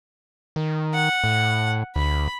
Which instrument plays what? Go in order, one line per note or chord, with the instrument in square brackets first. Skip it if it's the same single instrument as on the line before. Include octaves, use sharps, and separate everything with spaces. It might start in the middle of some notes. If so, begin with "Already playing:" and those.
[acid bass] D#3
[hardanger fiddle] F#5
[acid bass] A2
[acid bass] D2 [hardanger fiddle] B5